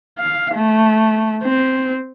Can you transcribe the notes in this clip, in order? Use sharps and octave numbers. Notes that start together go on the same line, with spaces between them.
F5
A3
C4